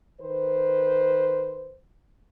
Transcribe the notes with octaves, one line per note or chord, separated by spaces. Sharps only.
D#3 B4 C5